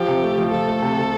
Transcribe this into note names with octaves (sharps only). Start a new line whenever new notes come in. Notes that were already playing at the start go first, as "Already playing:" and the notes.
Already playing: F3 G4
C3
A3
F3
F3 A4
A3
C3
C3